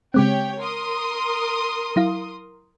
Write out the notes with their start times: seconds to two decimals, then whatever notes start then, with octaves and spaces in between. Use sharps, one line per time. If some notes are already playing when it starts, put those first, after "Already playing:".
0.14 C#3 G#3 C4 G4 C#5 G5
0.59 A#4 C6 D#6
1.96 F#3 E4 F5